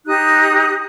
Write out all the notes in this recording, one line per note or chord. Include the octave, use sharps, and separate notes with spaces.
D#4 G4 D#6 F#6